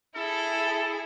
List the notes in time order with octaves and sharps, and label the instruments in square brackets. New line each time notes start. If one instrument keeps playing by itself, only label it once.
[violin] E4 G#4 [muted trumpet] A4